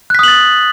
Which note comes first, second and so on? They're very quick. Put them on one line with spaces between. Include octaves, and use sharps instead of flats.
F#6 B6 D#6 F#7 A6